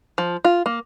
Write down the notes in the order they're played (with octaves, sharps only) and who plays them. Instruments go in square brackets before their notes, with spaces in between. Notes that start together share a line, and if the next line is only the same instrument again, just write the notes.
[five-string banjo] F3
F4
A#3